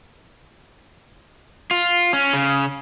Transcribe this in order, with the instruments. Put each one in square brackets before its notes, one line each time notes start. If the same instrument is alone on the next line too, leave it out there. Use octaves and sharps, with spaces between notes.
[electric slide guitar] F4
C#4
C#3